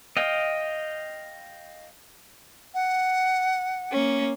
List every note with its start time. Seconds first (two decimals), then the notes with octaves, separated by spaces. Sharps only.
0.17 D#5 F5 G5
2.74 F#5
3.92 A#3 C#4